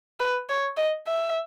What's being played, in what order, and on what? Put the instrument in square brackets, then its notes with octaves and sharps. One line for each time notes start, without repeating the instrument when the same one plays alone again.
[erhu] B4
C#5
D#5
E5